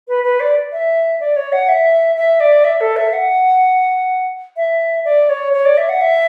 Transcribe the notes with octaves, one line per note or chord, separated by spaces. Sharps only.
B4
B4
D5
E5
D5
C#5
F#5
E5
E5
D5
E5
A4
E5
F#5
E5
D5
C#5
C#5
D5
E5
F#5
E5